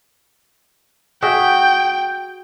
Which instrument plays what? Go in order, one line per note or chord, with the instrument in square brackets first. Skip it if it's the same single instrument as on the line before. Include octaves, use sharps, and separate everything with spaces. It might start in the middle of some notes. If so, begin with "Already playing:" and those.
[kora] F#4 G#4 E5 [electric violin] G5